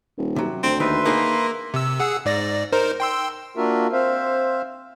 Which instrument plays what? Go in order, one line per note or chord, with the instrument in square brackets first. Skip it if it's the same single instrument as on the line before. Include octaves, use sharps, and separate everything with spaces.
[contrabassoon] D#1
[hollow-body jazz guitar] C3 F#3
[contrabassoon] D2 [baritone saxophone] C4
[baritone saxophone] D#2 [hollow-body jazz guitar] D#3 D#4 [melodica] B4 E5 C6
[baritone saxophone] A#3 [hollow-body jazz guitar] D#4 G#4 F#5
[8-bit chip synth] C3 E6
G#4 F#5 E6
G#2 D5 A#6
D#4 A#4 C5
G5 C6 E6
[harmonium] A#3 D4 F4 F#4 A#4 E5
C4 C5 E5 F5